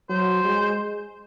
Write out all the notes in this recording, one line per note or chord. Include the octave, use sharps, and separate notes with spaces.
F#3 C5
G#3